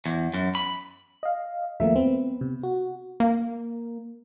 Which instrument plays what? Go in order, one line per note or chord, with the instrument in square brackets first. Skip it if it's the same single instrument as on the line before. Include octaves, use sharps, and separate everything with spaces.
[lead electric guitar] E2
F#2
B5
[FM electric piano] D#5 F5
[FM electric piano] D#2 F3 A3 [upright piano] A#3 E5
[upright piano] B3 [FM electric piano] C4
[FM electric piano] C3
F#4
[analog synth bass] A#3